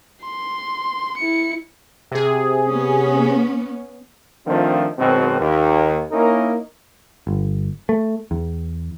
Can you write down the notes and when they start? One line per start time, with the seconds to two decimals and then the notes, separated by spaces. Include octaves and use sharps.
0.24 C6
1.17 E4 C#7
2.11 C3 G#4
2.69 B3 C#4
4.46 D#3 F3 A3 C4 D4 F4
4.99 F#2 B2 D#3 G#3 C4
5.40 D#2
6.11 A#3 C#4 D#4 E4 A#4
7.27 G1
7.89 A3
8.31 E2